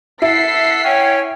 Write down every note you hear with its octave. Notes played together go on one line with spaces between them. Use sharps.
E4 A4 F#5 B6 C7
C#4 C#5 G5